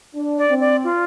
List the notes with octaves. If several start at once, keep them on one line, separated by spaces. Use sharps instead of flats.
D4
D5
C4
D5
F4